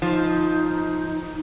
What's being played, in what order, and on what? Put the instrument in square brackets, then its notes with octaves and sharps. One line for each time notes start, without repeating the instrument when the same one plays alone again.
[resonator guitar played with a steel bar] F3 [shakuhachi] D#4